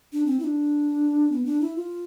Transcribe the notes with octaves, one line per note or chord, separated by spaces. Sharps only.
D4
C4
E4
D4
B3
D4
E4
F4